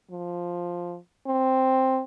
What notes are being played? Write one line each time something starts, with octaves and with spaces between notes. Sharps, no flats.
F3
C4